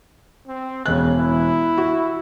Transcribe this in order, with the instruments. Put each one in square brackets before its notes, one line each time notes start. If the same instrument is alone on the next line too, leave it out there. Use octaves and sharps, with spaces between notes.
[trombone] C4
[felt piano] E1 F#6 [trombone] C#3
[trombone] E4
[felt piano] F#4